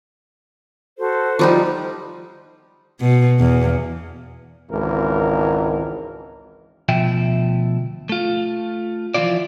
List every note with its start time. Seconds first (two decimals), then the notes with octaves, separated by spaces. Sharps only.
0.99 F#4 A4 C5
1.39 F3 G3 D#4
3.00 B2
3.39 E2
4.71 G#1 C#2 E3 A#4
6.89 D2 B2 F3 E5 G5
8.09 A3 F4
9.14 E3 F3 C4 E4 F4 D5